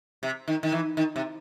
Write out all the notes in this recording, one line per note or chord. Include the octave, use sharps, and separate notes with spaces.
C3
D#3
D#3
E3
D#3
C3